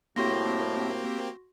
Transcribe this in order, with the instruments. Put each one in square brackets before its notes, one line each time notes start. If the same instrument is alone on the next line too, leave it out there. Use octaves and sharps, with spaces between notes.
[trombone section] C2 A2 [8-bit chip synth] A#3 C4 G4 [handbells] F#4 C6 A#6